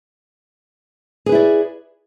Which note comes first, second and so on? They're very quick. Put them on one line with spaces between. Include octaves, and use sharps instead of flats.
G#4 B4 E4 D5